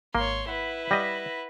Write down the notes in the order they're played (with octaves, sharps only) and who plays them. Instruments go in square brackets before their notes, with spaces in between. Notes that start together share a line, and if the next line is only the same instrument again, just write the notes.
[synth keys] G#1 [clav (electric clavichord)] A#3 [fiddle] C#5 C6
[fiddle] E4 B4 [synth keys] F#5
[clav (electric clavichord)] G3 D#5 [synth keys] F#5 A#6 B6